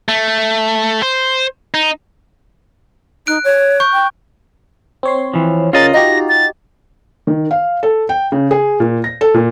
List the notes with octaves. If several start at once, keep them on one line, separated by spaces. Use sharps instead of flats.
A3
C5
D#4
D#4 F#6 D7
C#5
C#6 G6
G5
C4 C#5 C6
E3 F3
C#3 C#4 F4 A#4 D#5 A6
D#4 F#4 G4 A#6
A6
D#3
F5
A4
G5
C#3
G#4
A#2
A#6
A4
A#2